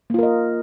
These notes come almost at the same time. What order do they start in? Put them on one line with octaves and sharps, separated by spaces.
A#3 F4 A#4 D#5